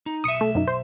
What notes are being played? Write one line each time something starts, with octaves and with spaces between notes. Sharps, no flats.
D#4
B1 E5 D#6 C#7 D#7
A3
F#2 D#4
C5